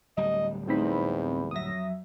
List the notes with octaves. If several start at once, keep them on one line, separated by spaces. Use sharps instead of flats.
D1 G3 D#5
E2 A2 C4 D#4 C5 B5
F2 F#3 E5 D#6 A#6